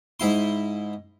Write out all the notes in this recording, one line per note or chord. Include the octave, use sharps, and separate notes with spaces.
G#2 E4 C6